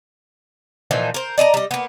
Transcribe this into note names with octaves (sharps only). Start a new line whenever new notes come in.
A#2 E3 F3 D#4
A#4 C5
D5 D#5 A5 A#5
G3 D#5
A#3 B3